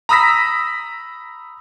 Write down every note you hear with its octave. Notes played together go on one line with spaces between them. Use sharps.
A#5 B5 D#6 E6 A#6 B6